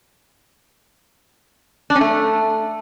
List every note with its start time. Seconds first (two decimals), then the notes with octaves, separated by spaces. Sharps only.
1.90 D4
1.95 C#4
2.01 A3